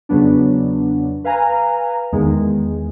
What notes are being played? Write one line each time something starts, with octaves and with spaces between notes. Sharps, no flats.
E2 C#3 F#3 B3 D4
B4 F5 G#5 A#5
E2 D#3 G#3